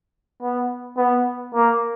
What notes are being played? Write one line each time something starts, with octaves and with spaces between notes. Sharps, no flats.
B3
B3
A#3